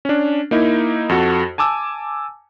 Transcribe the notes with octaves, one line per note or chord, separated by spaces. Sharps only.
C#4 D4
A#3 D#4 E4
F2 F#4 A4
G#5 A5 D6 E6